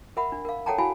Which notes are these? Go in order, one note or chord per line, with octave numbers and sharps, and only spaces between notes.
A#4 E5 F#5 B5
D4
A#4 F5
A4 C#5 F#5 G5 A5 A#5
E4 F#4 F5 G#5 B5